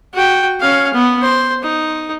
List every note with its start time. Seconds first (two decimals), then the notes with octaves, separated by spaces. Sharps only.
0.14 F#4 G5
0.61 C#4 F5
0.94 B3
1.22 C5
1.63 D#4